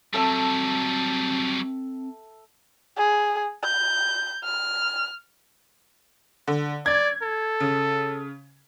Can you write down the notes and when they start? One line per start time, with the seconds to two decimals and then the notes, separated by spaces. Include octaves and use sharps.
0.14 F#3 G3 C4 A4 E5 A5
2.97 G#4
3.64 G6
4.44 F6
6.48 D3
6.86 D5 G#6
7.22 A4
7.60 C#3